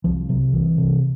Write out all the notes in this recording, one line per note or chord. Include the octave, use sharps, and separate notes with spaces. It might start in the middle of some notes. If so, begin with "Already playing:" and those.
C2 F3
C3 F#3
C2 E3
C3